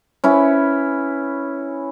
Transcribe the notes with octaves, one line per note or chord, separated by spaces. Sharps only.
C#4 E4 B4